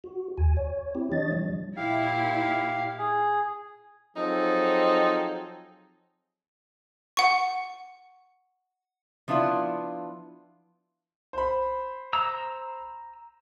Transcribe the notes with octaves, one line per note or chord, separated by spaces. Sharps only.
F#4
D#2 G#5
C#5
C4 E4 G4
E3 D4 C#5 D#5 A6
F3 G3
A#2 E4 G4 F5
G#4
F3 F#3 C4 D#4 G#4 A4
F#5 C#6
F3 B3 D4 E4 F4
C5 B5
A#5 E6